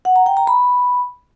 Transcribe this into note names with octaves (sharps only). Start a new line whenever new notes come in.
F#5
A#5
G5
A#5
B5